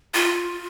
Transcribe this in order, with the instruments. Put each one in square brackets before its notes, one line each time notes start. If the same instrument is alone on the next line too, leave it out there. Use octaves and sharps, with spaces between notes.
[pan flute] F4